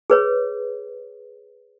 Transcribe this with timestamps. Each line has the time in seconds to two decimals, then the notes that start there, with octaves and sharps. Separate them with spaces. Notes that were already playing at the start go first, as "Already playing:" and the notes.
0.10 G#4 B4 C#5